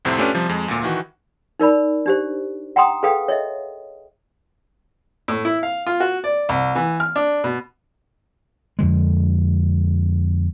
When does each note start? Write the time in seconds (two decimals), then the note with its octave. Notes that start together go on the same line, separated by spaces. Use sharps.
0.05 C2 F2 A2 C3 C4
0.18 A3 C#4 D4 F4 G4 B4
0.34 C3 F3 G3
0.49 F2 G#3
0.68 D2 A#2
0.83 D#3 E3 F#4
1.59 D#4 A#4 D5 B5
2.06 D4 G4 C5
2.76 F#5 G5 A#5 C6 D#6
3.03 G#4 A4 B4 F5 G5 D#6
3.28 C#5 D#5 E5
5.28 A2
5.45 E4
5.63 F5
5.87 F4
6.00 F#4
6.24 D5
6.49 C2
6.75 E3
7.00 F6
7.16 D4
7.44 B2
8.79 F2 D3 G#3